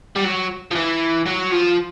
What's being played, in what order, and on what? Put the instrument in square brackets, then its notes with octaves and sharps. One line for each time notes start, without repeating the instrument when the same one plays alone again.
[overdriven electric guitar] G3
F#3
F3
E3
F#3
F3